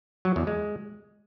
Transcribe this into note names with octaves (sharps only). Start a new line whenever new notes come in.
F#3
E2
G#3